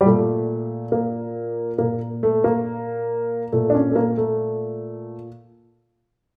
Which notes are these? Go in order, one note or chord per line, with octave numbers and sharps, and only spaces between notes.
G3
A#2 A3
A#3
A#2 A#3
A3
A#3
A#2 A3
D4
C#4
A3
A#3
A3